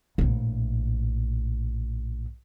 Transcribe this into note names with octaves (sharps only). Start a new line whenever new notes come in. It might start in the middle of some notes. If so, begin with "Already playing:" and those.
A#1 A2